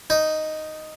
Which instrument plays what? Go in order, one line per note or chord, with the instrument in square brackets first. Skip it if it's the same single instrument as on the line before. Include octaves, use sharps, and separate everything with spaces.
[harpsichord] D#4